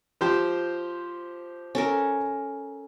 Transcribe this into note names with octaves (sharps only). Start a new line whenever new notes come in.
F3 G4 C5
C#4 A4 A#4